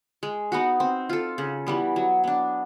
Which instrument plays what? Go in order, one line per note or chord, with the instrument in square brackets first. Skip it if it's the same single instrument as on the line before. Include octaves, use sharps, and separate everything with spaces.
[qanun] G#3
B3 D#4 F#4
C4
F4 A4
C#3
E3 G3 B3
F#3
B3 D4